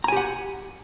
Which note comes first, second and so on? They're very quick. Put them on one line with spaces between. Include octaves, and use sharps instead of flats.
A#5 G#5 G4 F#5